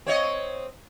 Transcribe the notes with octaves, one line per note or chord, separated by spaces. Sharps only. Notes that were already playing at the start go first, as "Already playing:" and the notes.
C4 C#5 D#5